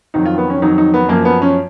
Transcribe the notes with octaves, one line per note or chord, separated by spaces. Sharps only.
F2 D#3 F#3 D#4
F4
B3
C#4
F2 D#3 F#3 D#4
D#4
B3
F#2 F3 A#3
B3
C#4